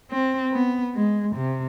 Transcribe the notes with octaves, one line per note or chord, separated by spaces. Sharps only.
C4
B3
G#3
C3